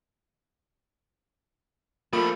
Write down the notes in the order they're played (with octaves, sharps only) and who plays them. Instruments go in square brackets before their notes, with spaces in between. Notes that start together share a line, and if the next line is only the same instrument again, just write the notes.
[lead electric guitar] F3 A3 [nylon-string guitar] A#3 [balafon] F4 [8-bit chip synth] B5